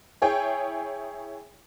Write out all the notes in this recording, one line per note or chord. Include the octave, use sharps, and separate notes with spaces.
E4 G#4 C#5 G5